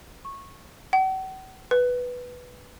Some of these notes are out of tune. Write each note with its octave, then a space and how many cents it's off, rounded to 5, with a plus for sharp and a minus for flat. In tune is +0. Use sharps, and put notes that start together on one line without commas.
C#6 -15
F#5 +45
B4 +0